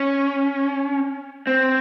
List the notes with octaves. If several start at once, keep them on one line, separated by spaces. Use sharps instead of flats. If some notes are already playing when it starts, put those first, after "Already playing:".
Already playing: C#4
C4